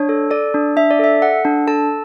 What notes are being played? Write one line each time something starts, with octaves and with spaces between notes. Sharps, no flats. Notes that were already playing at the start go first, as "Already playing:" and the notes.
Already playing: D4 C#5
A4
A4 D5
D4
D4 E5
D5
A4 E5
A4 F#5
D4
A4 A5